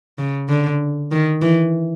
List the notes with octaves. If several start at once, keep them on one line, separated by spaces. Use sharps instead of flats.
C#3
D3
D#3
E3